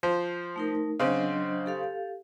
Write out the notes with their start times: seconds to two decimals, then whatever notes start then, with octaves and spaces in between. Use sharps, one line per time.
0.03 F3 C5
0.56 A3 D#4 A#4
1.00 C#3 F#3 C4 D4 D#5
1.66 G4 A4 F5